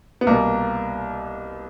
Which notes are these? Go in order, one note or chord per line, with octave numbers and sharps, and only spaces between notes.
B3
C2 B2 A#3